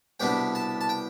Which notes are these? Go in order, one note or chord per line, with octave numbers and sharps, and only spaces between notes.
C2 B2 G3 B3 D4 G5
A5
A5
G5